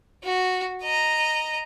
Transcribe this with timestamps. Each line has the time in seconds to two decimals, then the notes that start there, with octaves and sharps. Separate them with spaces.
0.24 F#4
0.83 D#5 A#5